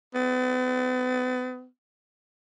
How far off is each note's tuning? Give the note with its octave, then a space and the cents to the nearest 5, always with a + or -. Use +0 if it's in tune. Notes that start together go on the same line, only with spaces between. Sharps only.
B3 +40